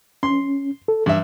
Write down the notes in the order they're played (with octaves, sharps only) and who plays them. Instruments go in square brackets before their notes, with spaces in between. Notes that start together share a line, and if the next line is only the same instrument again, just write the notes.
[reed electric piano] C#4 [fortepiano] C6
[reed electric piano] A4
[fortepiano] G2 E5 [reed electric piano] E3